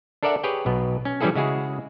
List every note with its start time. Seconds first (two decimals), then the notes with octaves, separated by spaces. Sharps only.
0.23 D4 A4 A#4 D5 E5 F#5
0.43 G4 G#4 B4 C#5 G5
0.66 B1 B2 B3
1.05 C#4
1.20 E3 G3 C#4 E4 G#4 A4
1.36 C#3 G#3 E4 F#4 G#4